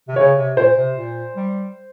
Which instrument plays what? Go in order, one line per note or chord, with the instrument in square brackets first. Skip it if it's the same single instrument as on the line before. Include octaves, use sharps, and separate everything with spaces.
[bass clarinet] C3
[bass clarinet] C#3 [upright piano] C#5
[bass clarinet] C3
[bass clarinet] A#2 [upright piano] C5
[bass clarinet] C3
A#2
G3